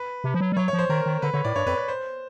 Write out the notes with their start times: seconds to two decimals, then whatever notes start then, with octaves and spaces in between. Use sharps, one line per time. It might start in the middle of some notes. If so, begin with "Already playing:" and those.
Already playing: B4
0.24 C3
0.34 F3
0.40 F#3
0.52 G3
0.57 F#3 C#5
0.68 C#5
0.73 F3
0.79 C5
0.89 D#3 A#4
1.06 D#3
1.22 D3 B4
1.33 D3 C#5
1.45 A2 D5
1.56 G2 C#5
1.66 F2 B4
1.77 B4
1.88 C5